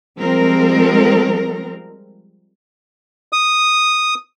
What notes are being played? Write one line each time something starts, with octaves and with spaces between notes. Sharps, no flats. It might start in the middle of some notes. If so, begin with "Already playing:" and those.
F3 G3 G#3 C4 A#4
D#6